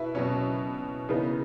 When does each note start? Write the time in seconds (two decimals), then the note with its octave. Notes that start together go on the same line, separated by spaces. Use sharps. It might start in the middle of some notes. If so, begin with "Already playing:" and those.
Already playing: B2 E4 B4
0.15 B2 F#3 C#4
1.09 C#3 E3 B3 D#4